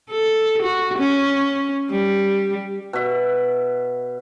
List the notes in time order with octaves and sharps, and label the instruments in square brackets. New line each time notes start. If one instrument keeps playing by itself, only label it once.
[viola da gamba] A4
F#4
C#4
G3
[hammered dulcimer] B2 E5